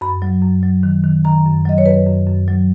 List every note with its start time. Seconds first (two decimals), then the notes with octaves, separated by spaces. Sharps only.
0.01 F#2 B5
0.22 F#3
0.43 F#2
0.63 F#3
0.83 D#3
1.04 D#3
1.25 D#3 A#5
1.45 F#2
1.65 F#3 D#5
1.78 C#5
1.86 F#2 B4
2.07 F#2
2.27 F#2
2.48 F#3